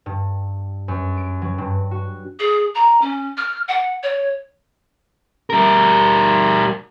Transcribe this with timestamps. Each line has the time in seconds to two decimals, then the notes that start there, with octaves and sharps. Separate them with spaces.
0.06 G2
0.88 F#2
1.17 D7
1.42 F#3
1.58 G2
1.91 F#4
2.39 G#4
2.75 A#5
3.01 C#4
3.37 F6
3.68 F#5
4.03 C#5
5.50 G3 A#4